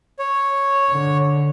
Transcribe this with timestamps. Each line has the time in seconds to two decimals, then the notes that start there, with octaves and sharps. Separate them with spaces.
0.19 C#5
0.91 D3